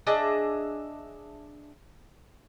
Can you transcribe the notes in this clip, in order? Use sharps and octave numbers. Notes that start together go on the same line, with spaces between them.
D4 G#4 D#5 E5